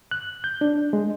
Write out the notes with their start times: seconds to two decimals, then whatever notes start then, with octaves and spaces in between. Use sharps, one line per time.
0.11 F#6
0.44 G6
0.61 D4
0.93 G#3